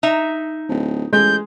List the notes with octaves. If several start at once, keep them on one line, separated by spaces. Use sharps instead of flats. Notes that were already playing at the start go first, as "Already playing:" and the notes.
D#4 E5 A#5
D1
A1 G#3 G6